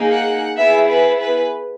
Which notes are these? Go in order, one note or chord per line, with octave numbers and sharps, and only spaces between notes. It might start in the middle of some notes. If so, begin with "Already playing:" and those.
Already playing: A#3 D#4 G#4
F#5
B3 E4 G#4 E5
B4
B4